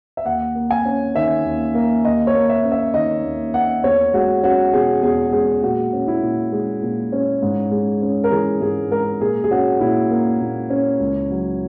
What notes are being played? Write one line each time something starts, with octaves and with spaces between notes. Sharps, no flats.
E5
D#2 F#5
A#3
G#5
C#4
D#3 E5
D#2
A#3
D#2 D#5
C#5
A#3
E5
C#4
E5
D#3 D#5
D#2
A#3 F#5
E2 C#5
G#3 F#4
C#4 F#4
B2 G#4
E2 G#4
G#3 G#4
A#2 F#4
C#4
E4
A#2
G#3
A#2
C#4
G#2
G#3
C#4
A#4
E3 G#4
G#2 G#4
G#3 A#4
A#2 G#4
G#4
C#4 F#4
A#2 E4
A#3
A#2
C#4
C#2
F#3